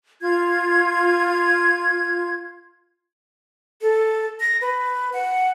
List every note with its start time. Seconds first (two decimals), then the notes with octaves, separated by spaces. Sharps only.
0.21 F4 G#6
3.81 A4
4.40 A#6
4.61 B4
5.13 F#5